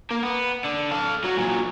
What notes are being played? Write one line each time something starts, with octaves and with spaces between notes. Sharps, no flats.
A#3
B3
D3
A4 F5
F#3 F#4
A#2 F#3